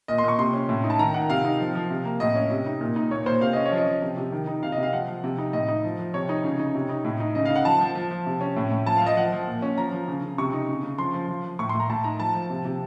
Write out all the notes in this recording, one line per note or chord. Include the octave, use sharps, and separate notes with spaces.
A#2 D#5
C6
A#2 C#6
C3 C6
C#4
A2
D#4
A5
D#3 A#5
D#3 F#5
C3 F5
D#4
F3
F3
C3
A#3
A2 D#5
C#4
C3
D#4
A#2
D#4
A#2 C#5
A#2 C5
C3 F5
C#4 D#5
C#5
F3
D#5
F3
C3
C3
D#3
D#4
C3 F5
D#5
C3 F5
F3 F#5
F3
C3
D#4
A2 D#5
D#4
F3
F3
C3 C#5
D#4
C#3
D#4
C3
D#4
A2
D#4
C#3 D#5
F5
D#4
F#5
F3 A5
F3
F3
F3
C3
C#4
A2
A2
F3 A5
F5
F3 D#5
F3 F#5
F3
A#2
C#4
F3 A#5
F3
C#3
C#3
C3 C#6
D#4
C#3
C#3
F3 C6
F3
F3
F3
A2 C#6
C6
A2
A#5
A2 A5
D#4 A#5
F3 A5
F3
C3
C3